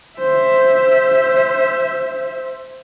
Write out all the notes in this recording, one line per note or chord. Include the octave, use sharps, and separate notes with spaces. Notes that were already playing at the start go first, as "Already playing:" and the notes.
C5 E5